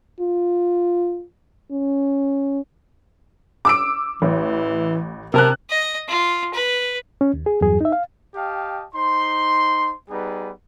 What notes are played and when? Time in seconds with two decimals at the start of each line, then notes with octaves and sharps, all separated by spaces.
0.20 F4
1.71 C#4
3.65 D6 E6 D7
4.22 A1 E3
5.34 C3 A#4 A5 F#6
5.70 D#5
6.08 F4
6.54 B4
7.21 C#4
7.34 D#2
7.46 G#4
7.61 E2 G2 F#3 G#4
7.81 D#4 E5
7.92 F5
8.35 G4 D#5 F5 G5 A5
8.94 D#4 C5 C6
10.09 G3 B3 D#4 G#4 B4